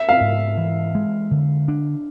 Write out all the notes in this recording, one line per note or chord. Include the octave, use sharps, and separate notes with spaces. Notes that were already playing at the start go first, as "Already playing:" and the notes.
Already playing: E5
F5
G#2
E3
G#3
D3
D4